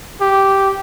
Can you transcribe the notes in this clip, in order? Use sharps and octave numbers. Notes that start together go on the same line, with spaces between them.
G4